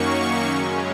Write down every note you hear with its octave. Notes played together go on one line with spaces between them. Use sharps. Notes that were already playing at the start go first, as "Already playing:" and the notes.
Already playing: F#2 D#3 F#3 A#3 C#4 C#6
F#2 C#3 G#3 C#4